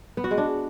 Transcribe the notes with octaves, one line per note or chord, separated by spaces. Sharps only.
B3
F#4
G#3
D4